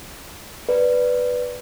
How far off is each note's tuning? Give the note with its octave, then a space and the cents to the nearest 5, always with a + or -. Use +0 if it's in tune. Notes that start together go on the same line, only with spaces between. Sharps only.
B4 +0 D5 +0